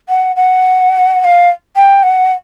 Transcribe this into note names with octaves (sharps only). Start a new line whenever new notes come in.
F#5
F#5
F#5
F5
G5
F#5